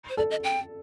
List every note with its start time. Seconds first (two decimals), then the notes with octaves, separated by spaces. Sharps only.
0.09 C5
0.17 A4 D5
0.30 D#5
0.44 G5